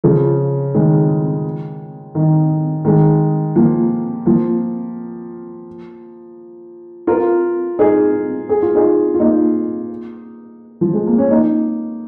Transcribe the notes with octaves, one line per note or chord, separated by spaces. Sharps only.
C#3 F3
D#3 G#3
D#3
D#3 G#3
F3 A#3
F3 A#3
F4 A#4
D#4 G#4
G#4
F4
D#4 G#4
F4
A#3 D#4
F3
G#3
A#3
C#4
A#3 D#4